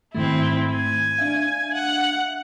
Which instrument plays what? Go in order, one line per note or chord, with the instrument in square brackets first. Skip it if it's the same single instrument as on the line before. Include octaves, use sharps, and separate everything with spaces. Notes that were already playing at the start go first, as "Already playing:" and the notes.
[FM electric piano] G#2 D#3 A3 [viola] C4 E4
[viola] G#5
[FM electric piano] D4 E5 F5
[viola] F#5